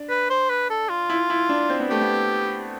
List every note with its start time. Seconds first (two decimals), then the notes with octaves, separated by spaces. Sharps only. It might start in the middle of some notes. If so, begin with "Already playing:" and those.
Already playing: D4
0.09 B4
0.30 C5
0.49 B4
0.70 A4
0.89 F4
1.10 E4
1.30 E4
1.49 D4
1.70 C4
1.80 B3
1.90 A3 G4
2.01 B3